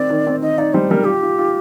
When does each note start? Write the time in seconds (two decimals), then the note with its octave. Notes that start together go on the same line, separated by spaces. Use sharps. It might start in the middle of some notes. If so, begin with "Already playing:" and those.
Already playing: D#3 C4 D5
0.10 D#3
0.27 C4
0.42 D#3 D#5
0.58 D#4 D5
0.74 G3 C5
0.91 G3 A#4
1.06 F4 G4
1.23 F4
1.38 F4